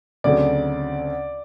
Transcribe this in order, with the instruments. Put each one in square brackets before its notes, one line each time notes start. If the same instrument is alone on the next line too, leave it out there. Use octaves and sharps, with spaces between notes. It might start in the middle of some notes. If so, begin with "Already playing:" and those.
[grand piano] D2 C#3 F#3 A3 C4 [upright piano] D5